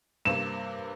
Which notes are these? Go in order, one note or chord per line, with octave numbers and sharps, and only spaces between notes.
G2 C3 A#3 E7